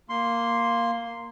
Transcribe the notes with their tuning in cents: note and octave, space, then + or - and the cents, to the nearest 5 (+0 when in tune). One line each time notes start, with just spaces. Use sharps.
A#3 -5 C6 +0